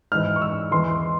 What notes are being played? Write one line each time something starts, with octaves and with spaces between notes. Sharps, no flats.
G#2 E3 F6
C#6
E6
E2 E3 C6